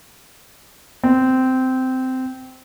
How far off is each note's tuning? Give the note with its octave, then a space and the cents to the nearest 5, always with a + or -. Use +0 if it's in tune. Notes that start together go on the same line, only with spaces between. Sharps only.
C4 -15